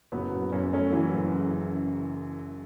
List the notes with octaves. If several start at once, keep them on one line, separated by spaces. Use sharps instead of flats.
F#1 F#3 B3
F#1
F#2 C#4
F#3 A3 C#4
E3 F#3
F#1
C#3
C#3
C#3